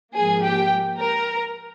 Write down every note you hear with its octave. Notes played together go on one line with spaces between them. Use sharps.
G#2 F3 A#3 G#4 G#5
G4 G5
A#4 A#5